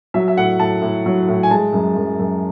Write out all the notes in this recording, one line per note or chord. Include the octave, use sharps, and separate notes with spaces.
F#3 E5
E5
A2 F#5
A2 A5
A2
F#3
A2
G#5
G#3 A5
F#2
F#2
F#2